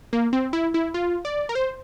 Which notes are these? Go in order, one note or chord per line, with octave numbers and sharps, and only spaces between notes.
A#3
C4
E4
E4
F4
D5
A#4
C5